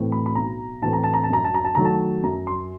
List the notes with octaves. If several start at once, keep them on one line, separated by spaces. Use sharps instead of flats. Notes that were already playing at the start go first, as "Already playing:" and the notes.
Already playing: A2 E3 A3 C4
B5
B5
B1 A#5
A2 E3 A3 C4 A5
A#5
A5
A#5
A5
F#2 A#5
A5
A#5
A5
D#3 F#3 A3 A#5
A5
F#2 A#5
C6